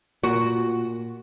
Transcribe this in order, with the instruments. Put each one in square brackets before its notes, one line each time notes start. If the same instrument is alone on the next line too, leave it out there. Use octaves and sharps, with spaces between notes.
[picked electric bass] A#2 [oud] F#4